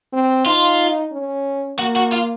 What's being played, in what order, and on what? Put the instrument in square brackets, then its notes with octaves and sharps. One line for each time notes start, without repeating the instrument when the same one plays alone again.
[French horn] C4
[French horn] D#4 [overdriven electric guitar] F4
[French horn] C#4
[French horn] A#3 [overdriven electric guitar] F#4
[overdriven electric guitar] F#4
F4